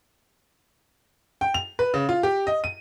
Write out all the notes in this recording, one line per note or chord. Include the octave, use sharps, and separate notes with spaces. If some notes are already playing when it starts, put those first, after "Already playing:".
G5
F7
B4
C#3
F4
G4
D#5
D#7